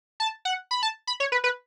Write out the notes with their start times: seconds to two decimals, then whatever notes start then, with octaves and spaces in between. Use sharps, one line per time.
0.20 A5
0.45 F#5
0.71 B5
0.83 A5
1.07 B5
1.20 C#5
1.32 B4
1.44 B4